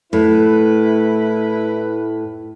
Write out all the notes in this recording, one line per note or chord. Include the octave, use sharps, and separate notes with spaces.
A2 E4 B4